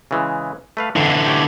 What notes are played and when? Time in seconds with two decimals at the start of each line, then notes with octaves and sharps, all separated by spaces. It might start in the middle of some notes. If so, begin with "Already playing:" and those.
0.11 C#3 E3 G#3
0.77 A3 B4 F5
0.96 F2 D3 E3
1.26 G4 C#5 D5